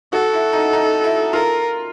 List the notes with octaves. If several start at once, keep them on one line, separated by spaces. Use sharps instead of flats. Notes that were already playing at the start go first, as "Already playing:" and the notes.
F#4 A4
E4
D#4
D#4
E4
F4 A#4